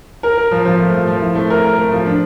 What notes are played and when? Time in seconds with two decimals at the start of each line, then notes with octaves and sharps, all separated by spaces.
0.23 A#4
0.37 A#4
0.51 F3
0.65 F3
0.79 A3
0.93 F3
1.07 F3
1.22 E4
1.35 A3
1.50 A#4
1.64 A#4
1.78 A3
1.92 F3
2.06 D4